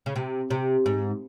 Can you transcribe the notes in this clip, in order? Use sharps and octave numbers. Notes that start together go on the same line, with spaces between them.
C#3
C3
C3
G#2